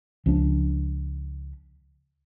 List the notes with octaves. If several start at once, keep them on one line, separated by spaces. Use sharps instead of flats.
C#2 F3 C#4 D4